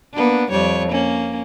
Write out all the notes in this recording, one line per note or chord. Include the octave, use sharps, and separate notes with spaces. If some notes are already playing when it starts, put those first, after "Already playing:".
A#3 B3 D4
F2 G3 C#5
A#3 C#4